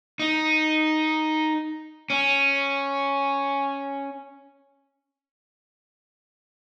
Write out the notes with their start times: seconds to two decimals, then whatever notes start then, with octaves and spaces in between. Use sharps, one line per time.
0.20 D#4
2.10 C#4